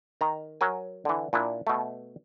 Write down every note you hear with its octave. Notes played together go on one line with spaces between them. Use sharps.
D#3 A#5
F#3 A#4 G#5
D3 E3
A#2 D4 E4
B2 A3